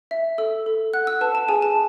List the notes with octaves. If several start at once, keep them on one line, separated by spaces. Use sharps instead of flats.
E5
A4 E6
A4
F#5 F#6
E6
B4 A5
A5
G#4 G#5
A5